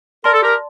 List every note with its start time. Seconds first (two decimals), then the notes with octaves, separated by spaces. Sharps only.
0.24 A#4 D5 A5 C6
0.34 A4
0.42 G4 A#4